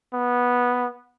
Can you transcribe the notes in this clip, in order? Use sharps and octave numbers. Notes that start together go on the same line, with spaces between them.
B3